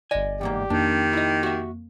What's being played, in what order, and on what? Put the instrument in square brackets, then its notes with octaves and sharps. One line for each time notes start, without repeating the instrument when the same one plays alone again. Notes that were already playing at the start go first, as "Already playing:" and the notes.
[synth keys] G1 D5 [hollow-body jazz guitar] D#5 G#5
[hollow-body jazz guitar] E2 G#2 A#3 [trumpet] G4
[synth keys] F2 A#3 [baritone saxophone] D#3 [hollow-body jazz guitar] D4
[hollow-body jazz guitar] E4 D#5
F#4 E5